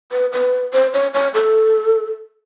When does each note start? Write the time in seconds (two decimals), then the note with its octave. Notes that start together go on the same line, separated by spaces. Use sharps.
0.12 B4
0.32 B4
0.73 C5
0.93 C#5
1.14 C#5
1.34 A4